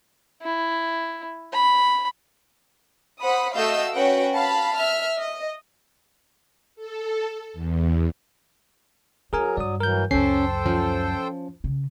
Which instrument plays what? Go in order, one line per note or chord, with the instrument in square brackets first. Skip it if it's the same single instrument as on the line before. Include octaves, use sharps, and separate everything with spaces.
[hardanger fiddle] E4
B5
[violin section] C5 F#5 B5 D#6
A3 F#4 D#5 F5 E6 G6
C#4 F#4 B4 F#5 G5
F5 A5 B5
E5 F6
D#5
[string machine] A4
E2
[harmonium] F#3 [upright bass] C#4 [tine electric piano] G#4 A#4 G#5
[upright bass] G2 [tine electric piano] D5 D#6
[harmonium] E3 F#3 [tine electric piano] A#4 G6
[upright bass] C#2 F#2 [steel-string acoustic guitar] C#4 [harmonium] A4 C5 G5 [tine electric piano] C7
[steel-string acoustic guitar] F3 [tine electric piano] C#4
[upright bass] C#3